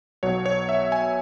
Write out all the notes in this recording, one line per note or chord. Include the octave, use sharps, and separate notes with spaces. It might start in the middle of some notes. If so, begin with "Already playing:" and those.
B1 B2 F#3 B3 C#5
C#5
E5
G#5